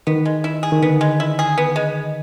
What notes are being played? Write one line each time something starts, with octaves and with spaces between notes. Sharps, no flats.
D#3 B3
G#3
E4
G#4
D#3
D3 B3
G#3
E4
G#4
B3
G#3